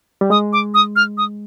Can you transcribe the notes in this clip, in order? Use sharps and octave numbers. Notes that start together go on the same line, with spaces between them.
G3
G#3 D#6
D6
D#6
F6
D#6